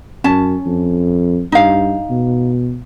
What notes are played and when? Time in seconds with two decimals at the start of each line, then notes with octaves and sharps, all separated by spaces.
0.24 F#2 C#4 A5
0.66 F2
1.52 G2 D#4 F5
2.11 B2